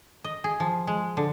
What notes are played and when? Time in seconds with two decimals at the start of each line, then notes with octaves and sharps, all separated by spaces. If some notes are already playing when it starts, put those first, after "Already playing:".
0.24 D#5
0.44 G#4
0.60 F3
0.87 G#3
1.17 D3